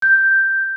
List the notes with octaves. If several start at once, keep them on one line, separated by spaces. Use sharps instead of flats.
G6